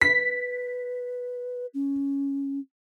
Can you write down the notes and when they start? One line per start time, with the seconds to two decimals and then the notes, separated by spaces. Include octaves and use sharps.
0.01 B4 B6
1.74 C#4